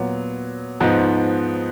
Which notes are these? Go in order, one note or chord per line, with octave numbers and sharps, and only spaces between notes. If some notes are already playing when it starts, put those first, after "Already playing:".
Already playing: A#2 F#3 B3
G#2 F3 B3 D#4